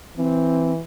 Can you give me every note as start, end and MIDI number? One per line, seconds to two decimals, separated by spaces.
0.17 0.81 52
0.17 0.71 60